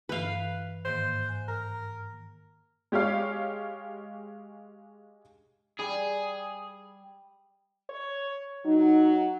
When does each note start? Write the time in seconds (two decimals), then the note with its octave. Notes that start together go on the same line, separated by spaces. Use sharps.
0.09 G2 E3 B4 F5
0.85 G#2 D#3 A#3 C5
1.26 G#5 F#6
1.48 A#4
2.92 G#3 G4 C#5 F5
5.80 G3 G#4
7.89 C#5
8.65 F#3 D#4